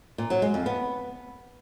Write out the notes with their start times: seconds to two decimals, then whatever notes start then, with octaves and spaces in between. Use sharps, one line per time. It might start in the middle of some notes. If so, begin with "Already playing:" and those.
0.18 A#2
0.30 F#3
0.42 G#3
0.54 F2
0.66 B3